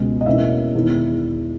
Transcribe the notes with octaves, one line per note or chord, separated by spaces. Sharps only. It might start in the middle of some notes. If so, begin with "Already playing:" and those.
Already playing: C#2 B2 G#3
D#5
E2 B2 A#3 C#4 E5
E1 E2 D#3